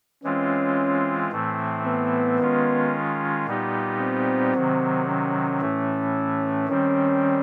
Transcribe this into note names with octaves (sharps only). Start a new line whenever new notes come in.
E3 G#3 C4 C#4 F4
A2 E3 A3 C4
B3
D#3 G#3 C#4 F4
A#2 G3 B3 D#4 G4
C4
C3 D#3 F#3
C#4
A2 E3 A3
D#3 G3 C4 C#4